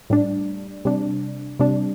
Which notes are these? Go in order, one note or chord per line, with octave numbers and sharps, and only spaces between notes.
A2 G3 D4
C3 G3 D4
C3 G3 D4